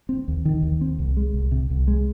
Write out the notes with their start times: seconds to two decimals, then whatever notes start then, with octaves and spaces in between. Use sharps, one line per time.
0.09 C4
0.28 D#2
0.45 D#3
0.63 D#2
0.81 C4
0.99 C2
1.17 G#3
1.34 C2
1.52 C3
1.70 C2
1.88 G#3